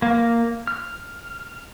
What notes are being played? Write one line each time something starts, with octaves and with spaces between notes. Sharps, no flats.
A#3
F6